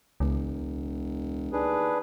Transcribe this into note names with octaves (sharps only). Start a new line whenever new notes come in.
E1 C#2
D#2 D4 G#4 B4